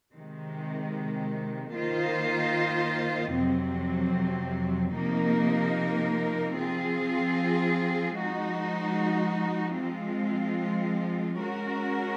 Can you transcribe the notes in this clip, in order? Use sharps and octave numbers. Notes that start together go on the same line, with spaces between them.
C3 D#3 G#3
D#3 A#3 F4 C5 D#5
F2 C3 F#3 C4
C3 F3 A#3 D#4 A#4
F3 C4 F4 G#4
F3 G#3 D#4 F#4
F3 G#3 C4 F4
G#3 C#4 F#4 A#4